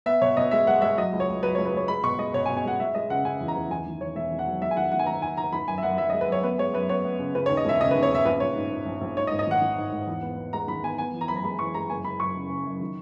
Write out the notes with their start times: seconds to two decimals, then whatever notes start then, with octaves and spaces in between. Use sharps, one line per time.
0.06 B3 E5
0.21 B2 C#5
0.37 B2 D#5
0.51 G#3 E5
0.67 G#3 F#5
0.82 G#3 E5
0.98 F#3 D#5
1.12 C#2
1.20 C#5
1.28 C#2
1.43 F#3 B4
1.55 C#5
1.58 C#2
1.66 B4
1.73 C#2 C#5
1.88 G#3 B5
2.03 B2 C#6
2.18 G#3 D#5
2.34 B2 C#5
2.46 G#5
2.49 B2
2.57 G#5
2.65 G#3 F#5
2.80 G#3 E5
2.95 G#3 D#5
3.10 C#3 F#5
3.25 C#3 G#5
3.41 E2
3.48 A#5
3.55 E2
3.70 E2 G#5
3.86 D#3
4.00 E2 C#5
4.15 E1 E5
4.32 D#3
4.39 F#5
4.47 F#3
4.61 G#3 E5
4.71 G#5
4.77 D#3 F#5
4.85 E5
4.92 D#3 F#5
4.99 G#5
5.06 D#3 A#5
5.22 D#2 G#5
5.37 D#2 A#5
5.53 D#3 B5
5.68 F#2 G#5
5.78 E5
5.83 F#2 F#5
5.98 F#2 E5
6.10 D#5
6.13 G#3
6.21 B4
6.28 F#2 C#5
6.43 B3 B4
6.58 G#3 C#5
6.73 F#2 B4
6.89 B3 C#5
7.05 B3
7.19 C#3
7.35 C#3 B4
7.46 C#5
7.49 D#2
7.57 D#5
7.65 E1 E5
7.80 C#3 D#5
7.91 B4
7.95 D#2
8.03 C#5
8.11 C#3 E5
8.25 A#1 B4
8.40 A#1 C#5
8.56 G#2
8.71 G#2
8.86 A#1
9.01 A#1
9.17 G#2 C#5
9.27 D#5
9.31 G#1
9.39 D#5
9.47 D#3 F#5
9.62 D#3
9.77 G#2
9.92 G#1
10.07 E2
10.22 B3
10.37 B3
10.53 G#3 A#5
10.68 D#3 B5
10.83 B3 G#5
10.98 B3 G#5
11.13 E3
11.21 A#5
11.28 F#2 B5
11.36 A#5
11.44 G#3 B5
11.59 E3 C#6
11.74 G#3 A#5
11.90 F#1 G#5
12.04 F#1 B5
12.20 F#2 C#6
12.35 C#3
12.50 C#3
12.65 F#2
12.81 D#3